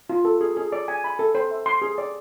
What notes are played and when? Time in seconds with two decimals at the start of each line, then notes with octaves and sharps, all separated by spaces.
0.10 F4
0.25 A4
0.41 G#4
0.57 G#4
0.72 D5
0.88 G#5
1.04 B5
1.19 A4
1.35 C5
1.51 E5
1.66 C6
1.82 G#4
1.98 D5